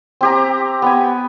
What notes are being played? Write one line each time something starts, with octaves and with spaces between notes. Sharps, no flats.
C4 G4 A#5
B3 G5 G#5